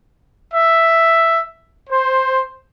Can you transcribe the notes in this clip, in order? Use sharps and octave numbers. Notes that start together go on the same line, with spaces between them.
E5
C5